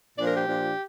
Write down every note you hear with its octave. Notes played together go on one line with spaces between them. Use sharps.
A#2 F3 D4 D5
A#4
G4
A#2 F3 D4